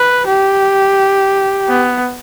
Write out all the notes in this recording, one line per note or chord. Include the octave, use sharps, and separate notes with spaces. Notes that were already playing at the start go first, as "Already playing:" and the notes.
Already playing: B4
G4
B3